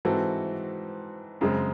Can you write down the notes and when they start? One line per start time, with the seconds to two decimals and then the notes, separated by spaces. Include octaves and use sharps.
0.05 G#2 E3 C4 F#4 A4
1.41 F#2 C#3 G#3 C4